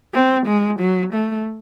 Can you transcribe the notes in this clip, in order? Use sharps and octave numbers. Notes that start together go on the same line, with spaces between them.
C4
G#3
F#3
A3